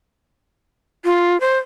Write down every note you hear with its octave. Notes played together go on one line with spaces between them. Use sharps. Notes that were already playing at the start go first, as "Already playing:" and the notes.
F4
C5